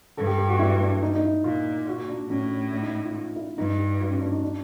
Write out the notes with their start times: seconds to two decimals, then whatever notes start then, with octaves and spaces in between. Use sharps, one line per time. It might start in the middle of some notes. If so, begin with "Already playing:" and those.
0.17 G2 A4
0.27 G4
0.38 G4
0.49 F#4
0.59 E4
0.80 D4
1.02 D#4
1.15 D#4
1.24 E4
1.44 A#2 F4
1.87 F#4
2.08 D4
2.30 A2 C#4
2.50 D4
2.73 D4
2.82 D#4
3.04 F4
3.15 F4
3.36 E4
3.57 G2 D#4
3.78 G4
4.00 F#4
4.11 C#4
4.21 D4
4.32 D#4
4.43 D4